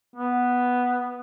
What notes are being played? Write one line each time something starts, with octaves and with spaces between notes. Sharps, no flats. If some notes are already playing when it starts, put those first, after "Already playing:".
B3